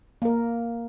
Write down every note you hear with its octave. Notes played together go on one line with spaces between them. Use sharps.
A#3 A#4